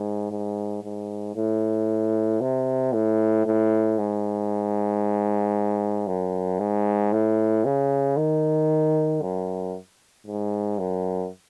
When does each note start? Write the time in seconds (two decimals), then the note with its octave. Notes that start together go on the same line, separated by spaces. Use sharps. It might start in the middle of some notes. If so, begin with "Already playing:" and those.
Already playing: G#2
0.31 G#2
0.83 G#2
1.36 A2
2.41 C3
2.93 A2
3.46 A2
3.98 G#2
6.07 F#2
6.60 G#2
7.13 A2
7.65 C#3
8.17 D#3
9.22 F#2
10.26 G#2
10.79 F#2